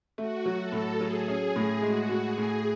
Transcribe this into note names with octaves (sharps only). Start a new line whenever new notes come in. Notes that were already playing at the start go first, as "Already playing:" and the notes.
A3 F#4
F#3
A4
A2
F#3 G#4
C#4
A2
G#3 F#4
A2
G#4
A2